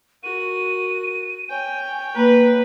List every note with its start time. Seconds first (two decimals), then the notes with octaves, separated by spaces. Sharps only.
0.23 F#4 A#4 D#7
1.50 C#5 G5 G#5
2.15 A#3 B4 A#5